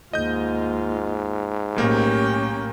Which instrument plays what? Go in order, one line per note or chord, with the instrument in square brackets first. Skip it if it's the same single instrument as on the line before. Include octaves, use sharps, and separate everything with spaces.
[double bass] D#2 [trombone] G#2 [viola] F4 [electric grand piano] D#5 G6
[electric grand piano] B1 A#3 A#4 [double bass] A2 C#4 [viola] G4 G5